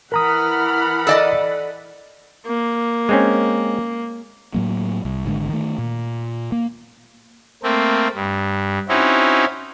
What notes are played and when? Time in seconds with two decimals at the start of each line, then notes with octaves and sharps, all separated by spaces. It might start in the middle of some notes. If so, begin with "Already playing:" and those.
0.12 E3 A#4 F#5 A#5 B5 D#6 F6
1.07 A4 D5 D#5
2.46 A#3
3.09 G#3 C4 C#4
4.54 A2 F#3 A#3
5.05 C2
5.26 G#1 D3 G#3
5.49 D#3 A3
5.78 A#2
6.52 A#3
7.63 A3 A#3 C4
8.15 G2
8.89 C4 C#4 D#4 E4 F#4